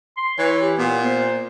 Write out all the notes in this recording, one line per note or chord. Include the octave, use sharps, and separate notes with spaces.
C6
E3 C#5
G4
A#2 B3
C5